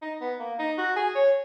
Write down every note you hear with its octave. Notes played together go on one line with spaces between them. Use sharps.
D#4
B3
A#3
D#4
F#4
G#4
C#5